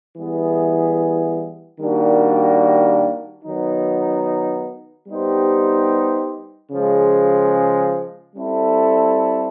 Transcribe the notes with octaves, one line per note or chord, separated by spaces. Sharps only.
E3 G3 B3 E4 G#4
D#3 G3 A#3 D4 F#4
D#3 F#3 B3 D#4
G3 B3 D#4 G4 C5
C#3 F3 G#3
G3 C4 E4 A4